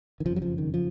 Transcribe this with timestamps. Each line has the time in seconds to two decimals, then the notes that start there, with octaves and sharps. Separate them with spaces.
0.20 D#3
0.26 F#1 F2 C#3 F3
0.36 F#3
0.42 F3
0.58 D#3
0.74 F3